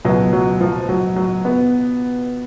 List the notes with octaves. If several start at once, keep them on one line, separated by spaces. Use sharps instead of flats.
C#2 B2 F#3
F#3
F3
F#3
F#3
B3